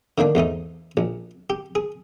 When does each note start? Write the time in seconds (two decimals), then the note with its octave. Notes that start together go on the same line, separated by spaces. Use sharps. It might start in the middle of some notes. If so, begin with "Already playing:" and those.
0.18 D3 D#3 A#3 D4
0.35 E2 G#2 A3 D#4
0.97 A#1
1.50 G4
1.75 G#4